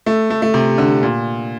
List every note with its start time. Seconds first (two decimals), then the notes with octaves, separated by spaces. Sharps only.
0.06 A3
0.30 A3
0.42 A3
0.54 C3
0.78 D3
1.03 A#2